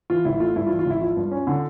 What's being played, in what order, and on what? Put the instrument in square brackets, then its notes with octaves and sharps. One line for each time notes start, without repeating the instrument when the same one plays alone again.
[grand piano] E3 F4
A1 E4
A3 F4
G2 E4
F4
E3
F4
A1 E4
F3 F4
G2
C#4
D3